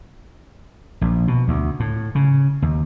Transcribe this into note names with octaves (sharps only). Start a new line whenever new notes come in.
A#1
B2
D2
A2
C#3
D#2